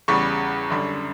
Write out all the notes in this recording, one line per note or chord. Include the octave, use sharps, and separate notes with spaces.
E2 C#3 G3 C#6
F#2 D3 G3